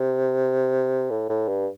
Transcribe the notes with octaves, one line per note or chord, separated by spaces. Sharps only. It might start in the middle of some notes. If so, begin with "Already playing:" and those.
Already playing: C3
A2
A2
G2